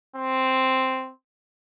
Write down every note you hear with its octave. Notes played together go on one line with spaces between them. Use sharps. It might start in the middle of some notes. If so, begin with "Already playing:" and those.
C4